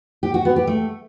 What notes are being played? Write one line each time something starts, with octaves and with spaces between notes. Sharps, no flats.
G4
F#4
B3
G4
A3